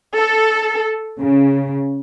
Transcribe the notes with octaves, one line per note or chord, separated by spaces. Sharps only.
A4
C#3